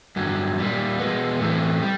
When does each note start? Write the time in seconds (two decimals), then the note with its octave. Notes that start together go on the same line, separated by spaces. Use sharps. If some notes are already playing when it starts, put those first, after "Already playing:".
0.16 G2 D3 F#3
0.58 A#2 G3 A#3
0.99 B2 G#3 B3
1.40 A2 E3 A3 C4
1.82 G3